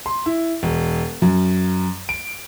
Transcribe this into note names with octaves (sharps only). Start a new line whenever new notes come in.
C6
E4
E1
F#2
D7